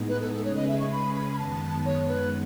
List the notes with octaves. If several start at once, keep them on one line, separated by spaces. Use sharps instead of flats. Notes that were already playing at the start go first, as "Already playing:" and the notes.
Already playing: A2 G#3 B3 D#4 G#4
B4
A4
A4
C#3 G#3 C#4 G#4 B4 C#5
D#5
E5
C#6
B5
B5
B5
F#2 D#3 G#3 B3 A5
C#5
B4